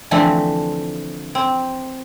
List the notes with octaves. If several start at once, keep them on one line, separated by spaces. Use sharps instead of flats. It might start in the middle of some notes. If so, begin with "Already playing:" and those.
D3 E3 F3 A3 C4
C4